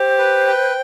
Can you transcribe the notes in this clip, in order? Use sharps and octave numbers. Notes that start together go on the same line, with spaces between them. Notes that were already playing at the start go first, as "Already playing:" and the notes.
Already playing: G4 C5
B4
G5